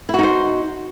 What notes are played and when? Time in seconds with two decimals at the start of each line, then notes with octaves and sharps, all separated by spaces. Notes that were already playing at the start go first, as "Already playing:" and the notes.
0.09 E4
0.14 F#4
0.19 D#4
0.23 C5